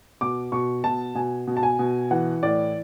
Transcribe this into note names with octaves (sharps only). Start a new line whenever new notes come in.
B2 D6
B2 C#6
B2 A5
B2 G#5
B2
A5
G#5
B2
E3 F#5
A2 D5